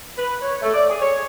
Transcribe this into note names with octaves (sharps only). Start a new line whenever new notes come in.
B4
C#5
A3
D5
G#4
C#5